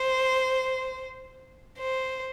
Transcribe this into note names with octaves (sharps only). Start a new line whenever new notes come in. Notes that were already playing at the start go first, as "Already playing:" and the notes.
Already playing: C5
C5